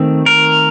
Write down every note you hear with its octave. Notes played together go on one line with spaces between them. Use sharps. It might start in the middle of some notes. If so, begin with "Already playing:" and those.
Already playing: D#3 A3 C4
A#4